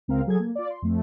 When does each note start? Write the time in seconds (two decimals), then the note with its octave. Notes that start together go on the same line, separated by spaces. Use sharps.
0.08 C#2 C4 A#4 F5
0.27 F#3 G#4 A4 G#6
0.40 A#3
0.55 F4 D5
0.70 C6
0.82 F2 A3